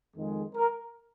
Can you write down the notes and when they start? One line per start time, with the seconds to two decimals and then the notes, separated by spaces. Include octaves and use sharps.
0.15 F2 D#3 G#3
0.55 A#4